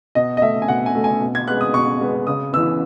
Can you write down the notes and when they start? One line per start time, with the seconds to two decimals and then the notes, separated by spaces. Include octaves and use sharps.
0.15 B2 D#5
0.37 D#5
0.42 A3 E5
0.62 G#5
0.68 B2 F#5
0.86 G#5
0.95 A3
1.04 G#5
1.21 B2
1.35 G#6
1.48 G#3 B3 F#6
1.61 D#6
1.73 B2 C#6
2.01 G#3 B3
2.27 C#3 D#6
2.53 E3 B3 E6